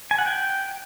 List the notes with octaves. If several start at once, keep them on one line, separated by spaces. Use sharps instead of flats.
G#5
F#5
G5